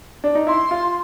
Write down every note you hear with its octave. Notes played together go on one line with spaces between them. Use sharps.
D4
D#4
E4 C6
F4